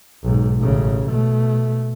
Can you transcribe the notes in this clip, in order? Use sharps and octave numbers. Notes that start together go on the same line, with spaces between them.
B1 G#2
A1 C#3
B2 A3